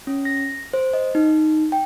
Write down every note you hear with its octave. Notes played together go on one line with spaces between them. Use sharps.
C#4
A#6
C5
D#5
D#4
G5